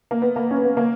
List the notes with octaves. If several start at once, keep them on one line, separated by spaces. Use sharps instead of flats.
A#3
B3
A#3
C#4
B3
A#3